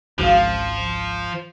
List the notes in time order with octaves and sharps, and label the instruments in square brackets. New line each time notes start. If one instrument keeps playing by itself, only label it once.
[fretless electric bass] G#1 C#2 G#2 [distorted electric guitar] F3 [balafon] F#4 F5